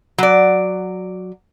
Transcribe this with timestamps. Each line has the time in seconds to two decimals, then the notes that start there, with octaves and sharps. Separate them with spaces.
0.18 F#3 D5